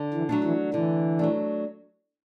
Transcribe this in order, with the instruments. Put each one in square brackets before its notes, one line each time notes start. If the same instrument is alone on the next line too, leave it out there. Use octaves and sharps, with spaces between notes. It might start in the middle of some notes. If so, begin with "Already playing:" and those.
Already playing: [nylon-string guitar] D3
[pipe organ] E3
[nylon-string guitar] F#3 A3 D4
[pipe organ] E3
[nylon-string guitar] D3 [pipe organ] E3
[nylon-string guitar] F#3 A3 D4